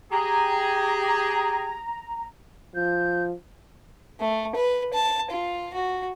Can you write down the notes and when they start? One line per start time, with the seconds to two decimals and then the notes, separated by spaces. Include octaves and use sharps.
0.11 G4 G#4 A#5
2.75 F3 G6
4.20 A3
4.55 B4
4.94 A5
5.31 F4
5.74 F#4